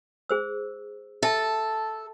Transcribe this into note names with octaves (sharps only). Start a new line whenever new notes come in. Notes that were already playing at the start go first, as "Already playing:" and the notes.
G#4 C5 E6
A4 E5 A5